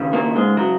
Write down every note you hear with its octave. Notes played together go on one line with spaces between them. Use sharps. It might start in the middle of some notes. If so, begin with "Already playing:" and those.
Already playing: D#2 C#3
A#2 A#3
G#2 G#3
F#3